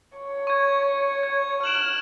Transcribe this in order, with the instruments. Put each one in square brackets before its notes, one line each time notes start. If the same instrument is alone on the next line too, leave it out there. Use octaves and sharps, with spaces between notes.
[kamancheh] C#5
[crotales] C#6 G#6
G#6
[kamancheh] F6 F#6 [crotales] D7 E7 F#7